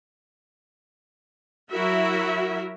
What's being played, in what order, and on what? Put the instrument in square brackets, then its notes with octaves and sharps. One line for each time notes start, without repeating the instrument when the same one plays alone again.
[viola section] F#3 E4 F#4 A#4 E5